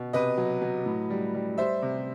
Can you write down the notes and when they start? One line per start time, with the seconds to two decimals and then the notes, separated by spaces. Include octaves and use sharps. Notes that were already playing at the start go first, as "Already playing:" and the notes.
Already playing: B2
0.13 C3 B4 D#5
0.38 F#3
0.62 F#3
0.86 A2
1.10 G3
1.35 G3
1.58 G3 C5 E5
1.82 C3